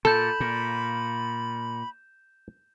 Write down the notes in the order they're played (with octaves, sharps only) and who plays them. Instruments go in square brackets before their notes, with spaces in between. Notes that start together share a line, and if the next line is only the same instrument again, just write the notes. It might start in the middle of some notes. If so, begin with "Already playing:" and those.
[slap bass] A#2 [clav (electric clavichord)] A4 [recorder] B5 [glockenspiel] G6 E7
[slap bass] A#2